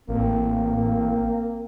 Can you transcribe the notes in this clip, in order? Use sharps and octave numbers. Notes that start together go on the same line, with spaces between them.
A1 A#3 C4